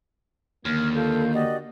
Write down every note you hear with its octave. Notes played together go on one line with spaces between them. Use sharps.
D#2 D3 A#3 F6 G#6
F4 A4 A#4 G6
F#4 G4 D5 D#5